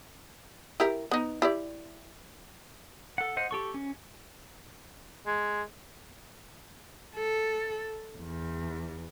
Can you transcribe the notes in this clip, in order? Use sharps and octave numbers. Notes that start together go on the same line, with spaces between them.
E4 G4 A#4
B3 D#4
E4 G4 D5
A4 F#5
C5 D#5 F#5
G4 A4 C#6
C#4
G#3
A4
E2